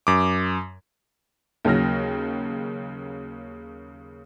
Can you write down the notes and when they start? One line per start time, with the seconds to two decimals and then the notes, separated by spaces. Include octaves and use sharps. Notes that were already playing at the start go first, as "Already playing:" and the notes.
0.07 F#2 D6
1.65 D#2 C#3 F#3 F6 A#6